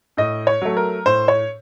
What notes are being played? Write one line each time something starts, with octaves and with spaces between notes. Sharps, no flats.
A2 D#5
C#5
F#3 A3
A#4
A2 C5
C#5